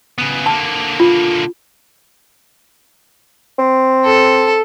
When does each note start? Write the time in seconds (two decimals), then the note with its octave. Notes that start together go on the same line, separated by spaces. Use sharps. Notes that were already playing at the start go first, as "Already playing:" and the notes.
0.18 C#3 B3
0.46 D3 A#3 A5
1.00 F4
3.59 C4
4.05 A4